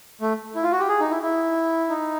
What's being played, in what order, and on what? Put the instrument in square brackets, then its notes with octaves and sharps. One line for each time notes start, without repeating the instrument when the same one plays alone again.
[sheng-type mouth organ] A3
E4
F4
F#4
G4
G#4
D#4
E4
E4
D#4